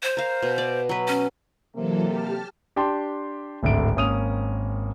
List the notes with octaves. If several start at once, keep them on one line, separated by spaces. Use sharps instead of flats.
C5
A#4 F5
B2
D5
F#3 B4
C#4
C3 E3 F#3 A#3 A4
G4 A5 F6
D4 G4 G5 A5 C6
D1 G#1 D3 E5 D7
G#1 A#3 C#4 D#6 D#7 F7